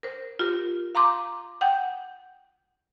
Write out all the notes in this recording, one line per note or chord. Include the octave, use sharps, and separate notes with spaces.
A#4 C5
F4 G4 A#4
F5 A#5 C6 D6
F#5 G5 G6